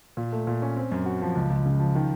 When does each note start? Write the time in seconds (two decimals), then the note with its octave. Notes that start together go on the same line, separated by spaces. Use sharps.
0.17 A#2
0.32 A3
0.47 A#2
0.62 C#4
0.76 C4
0.92 F#2
1.06 F#4
1.22 F3
1.35 C#2
1.50 C#2
1.66 C#3
1.80 F3
1.95 D#3